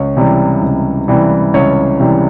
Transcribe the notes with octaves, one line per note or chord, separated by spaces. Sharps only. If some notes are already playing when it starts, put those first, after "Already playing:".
Already playing: C#2 C#5
C3 E3 G3
C#2
C3 E3 G3
C#2 C#5
C3 E3 G3